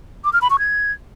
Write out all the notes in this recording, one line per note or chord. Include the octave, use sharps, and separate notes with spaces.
D6
F6
B5
C#6
G#6